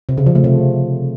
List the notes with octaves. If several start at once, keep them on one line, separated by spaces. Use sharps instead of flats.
C3
C#3
F3
A3
C3